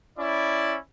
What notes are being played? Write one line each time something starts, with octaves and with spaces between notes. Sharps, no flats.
C#4 E4 D5